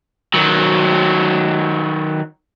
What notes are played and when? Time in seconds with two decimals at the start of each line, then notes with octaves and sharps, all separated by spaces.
0.34 D#3 F#3